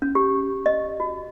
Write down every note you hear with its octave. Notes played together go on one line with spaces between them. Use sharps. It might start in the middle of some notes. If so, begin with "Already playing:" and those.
C#4
G4
D#5
F#4